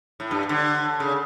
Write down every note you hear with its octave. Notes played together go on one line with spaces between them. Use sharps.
A2
G2
D3
C#3